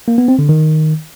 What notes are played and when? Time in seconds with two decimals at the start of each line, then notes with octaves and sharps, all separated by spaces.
0.08 A#3
0.18 B3
0.28 C4
0.39 D3
0.49 D#3